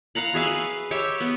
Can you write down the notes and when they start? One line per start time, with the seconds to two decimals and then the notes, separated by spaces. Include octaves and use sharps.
0.15 F5 F#5 A#5 B5
0.34 F#4 G#4 E5 F5
0.47 B4
0.91 G4 C#5 E5
1.20 B3